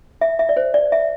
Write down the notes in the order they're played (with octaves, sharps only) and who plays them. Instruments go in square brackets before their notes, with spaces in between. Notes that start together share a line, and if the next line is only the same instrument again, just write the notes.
[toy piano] E5
E5
D5
C5
D5
E5